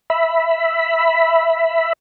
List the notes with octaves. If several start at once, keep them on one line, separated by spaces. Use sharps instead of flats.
E5 B5